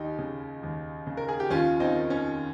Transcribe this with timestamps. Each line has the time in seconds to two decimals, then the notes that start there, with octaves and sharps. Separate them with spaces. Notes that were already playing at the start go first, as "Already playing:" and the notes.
Already playing: D#2 D#4 G4
0.19 C#3
0.63 D#2
1.07 C#3
1.17 A#4
1.28 G#4
1.40 G4
1.50 D#2 C#4 F4
1.80 C4 D#4
1.95 D#3
2.10 C#4